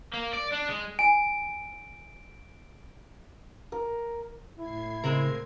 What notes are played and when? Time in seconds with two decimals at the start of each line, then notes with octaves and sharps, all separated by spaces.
0.14 A#3
0.34 D5
0.52 D4
0.69 G#3
0.99 G#5 D7
3.72 A#4
4.57 A2 E4 G#6 C7
5.04 C#3 G#3 C4 A#4